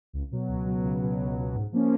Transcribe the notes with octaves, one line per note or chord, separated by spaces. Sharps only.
C#2
B2 F#3
C#2
B2 F#3
C#2
B2 F#3
C#2
B2 F#3
G#2
F3 A#3 C#4